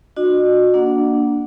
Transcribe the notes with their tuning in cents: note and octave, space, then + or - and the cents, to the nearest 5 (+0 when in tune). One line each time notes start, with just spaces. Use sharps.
D4 +25 F#4 -20 D#5 -45
A#3 +5 D4 -5 F#5 +0